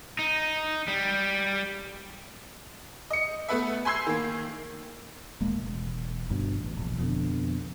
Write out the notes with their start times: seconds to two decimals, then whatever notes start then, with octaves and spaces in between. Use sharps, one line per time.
0.19 D#4
0.88 G3
3.11 D#5 C#7
3.49 A3 B3 B4 E5
3.85 G#5 B5 C6 E6 G#6 C7
4.07 D#3 A#3
5.41 D#1 A1 G#3 A#3
5.63 E1
6.29 G1 G2 B2
6.55 A1
6.77 E1 A#1
6.98 F2 B2 D3